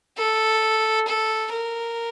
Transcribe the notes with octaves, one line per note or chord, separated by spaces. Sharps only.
A4
A4
A#4